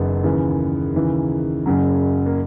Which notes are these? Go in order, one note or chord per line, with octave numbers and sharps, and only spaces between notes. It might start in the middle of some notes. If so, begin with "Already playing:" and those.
Already playing: F#1 F#2 D#3 B3
D#2 C#3 E3
D#2 C#3 E3
F#1 F#2 C#3 F#3
A#3